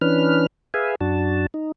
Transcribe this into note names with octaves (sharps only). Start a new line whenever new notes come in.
E3 C#4 D4 B4 F6
G#4 B4 E5 F5 G#5
F#2 D4 F#4 A5
D#4